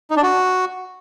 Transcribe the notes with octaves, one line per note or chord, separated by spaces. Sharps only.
D#4
D4
F#4